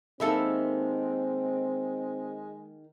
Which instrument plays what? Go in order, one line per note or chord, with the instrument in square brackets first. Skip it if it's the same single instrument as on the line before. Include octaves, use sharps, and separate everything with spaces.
[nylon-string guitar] D#3 A#3 D#4 [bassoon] G#3 [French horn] C4 [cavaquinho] A4 E5 B5